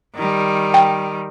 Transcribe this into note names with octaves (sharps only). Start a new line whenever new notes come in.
D#3 G3
G5